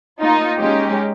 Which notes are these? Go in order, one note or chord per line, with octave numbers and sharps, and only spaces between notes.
A#3 D#4 F4
G#3 C#4 D#4 G4